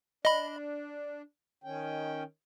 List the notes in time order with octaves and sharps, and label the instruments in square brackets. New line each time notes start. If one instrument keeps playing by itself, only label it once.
[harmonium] D4 [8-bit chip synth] D#5 B5
[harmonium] D#3 C#4 G5